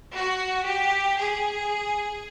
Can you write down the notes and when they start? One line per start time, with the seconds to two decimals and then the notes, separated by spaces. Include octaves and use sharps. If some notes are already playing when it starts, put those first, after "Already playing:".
0.16 F#4
0.66 G4
1.18 G#4